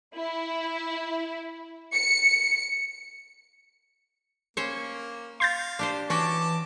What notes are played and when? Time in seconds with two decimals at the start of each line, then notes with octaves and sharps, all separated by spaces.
0.16 E4
1.95 C#7
4.57 A#3 C#4 C5 C#5
5.40 F5 C6 G6 A6
5.79 D4 G4 C5
6.10 E3 C#4 F#4 G5 A5 D6